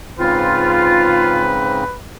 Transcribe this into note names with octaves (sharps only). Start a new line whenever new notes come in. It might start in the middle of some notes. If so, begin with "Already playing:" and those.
G#2 C#3 C4 F4 B4